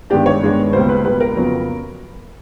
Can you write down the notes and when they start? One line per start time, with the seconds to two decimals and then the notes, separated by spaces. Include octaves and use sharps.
0.10 G2 D#3 G#3 B3 D4 G4
0.26 C#5
0.41 G2 D#3 G#3 B3 D4
0.73 C#2 B2 G3 A#3 C5
0.89 B4
1.05 C#2 B2 G3 A#3 B4
1.20 A#4
1.36 F2 C#3 F#3 B3